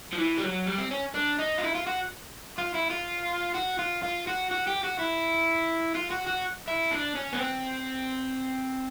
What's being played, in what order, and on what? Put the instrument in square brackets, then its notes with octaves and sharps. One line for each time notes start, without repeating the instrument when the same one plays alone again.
[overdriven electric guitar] F3
E3
G3
F#3
G3
C4
C#4
D4
D#4
F4
E4
F4
F#4
F4
E4
F4
F#4
F4
F4
F#4
F#4
G4
F#4
E4
F4
F#4
F#4
E4
D4
C#4
B3
C4